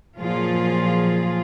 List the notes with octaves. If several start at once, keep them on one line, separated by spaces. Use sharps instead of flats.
A#2 F3 F#3 F4 G#4